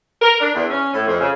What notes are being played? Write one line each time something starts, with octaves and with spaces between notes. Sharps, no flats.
A#4
D4
E2
C#4
A2
F2
C#3